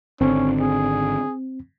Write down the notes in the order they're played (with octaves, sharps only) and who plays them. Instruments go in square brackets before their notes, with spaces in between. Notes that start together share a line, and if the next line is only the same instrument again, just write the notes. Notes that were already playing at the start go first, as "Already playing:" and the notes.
[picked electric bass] G#1 D3 [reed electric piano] C4 [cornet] C#4
[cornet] G#4